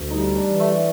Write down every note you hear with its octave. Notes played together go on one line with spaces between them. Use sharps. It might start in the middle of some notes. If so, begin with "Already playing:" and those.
Already playing: D2
G3 D#4
D4
E3
A3